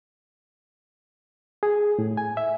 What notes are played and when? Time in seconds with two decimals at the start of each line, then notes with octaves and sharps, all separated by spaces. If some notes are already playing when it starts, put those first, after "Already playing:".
1.63 G#4
1.99 A2
2.17 G#5
2.37 E5